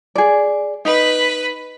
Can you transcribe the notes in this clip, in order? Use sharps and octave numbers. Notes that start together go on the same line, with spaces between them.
G#4 D5
D#4 B4 B5